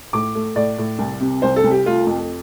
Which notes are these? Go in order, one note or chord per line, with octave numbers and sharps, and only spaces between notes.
A2 D6
A3
A2 D5
A2
C2
C3
C2 C5
A4
C2
G4
A3 F4
F2